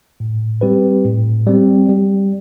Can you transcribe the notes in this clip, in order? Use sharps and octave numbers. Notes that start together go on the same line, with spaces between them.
A2
G3 C4 G4 B4
A2
G3 C4
G3